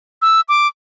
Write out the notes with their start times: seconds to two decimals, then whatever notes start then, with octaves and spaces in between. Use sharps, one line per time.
0.22 E6
0.49 D6